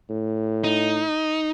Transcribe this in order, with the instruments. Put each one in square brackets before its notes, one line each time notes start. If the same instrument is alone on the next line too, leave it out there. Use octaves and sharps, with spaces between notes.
[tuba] A2
[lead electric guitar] D#4